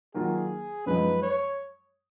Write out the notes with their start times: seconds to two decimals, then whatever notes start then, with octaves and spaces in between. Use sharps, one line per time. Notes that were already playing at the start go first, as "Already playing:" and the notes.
0.14 D#3 F#3 A#3 F4 G#4
0.86 F#2 F3 G#3 D#4 B4
1.22 C#5